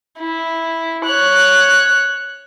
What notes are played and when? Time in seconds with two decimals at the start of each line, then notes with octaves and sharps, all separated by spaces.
0.20 E4
1.04 C#5 F#6